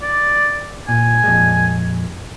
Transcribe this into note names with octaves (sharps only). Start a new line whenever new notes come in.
D5
A#2 G#5
F2 A#2 G#3